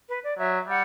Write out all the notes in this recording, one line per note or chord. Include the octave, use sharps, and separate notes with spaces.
B4
D5
F#3 E5
G3 F#5